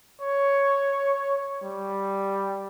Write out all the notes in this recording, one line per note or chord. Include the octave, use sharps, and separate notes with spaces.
C#5
G3